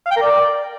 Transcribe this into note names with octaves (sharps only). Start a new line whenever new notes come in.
F5
G5
A#4
D5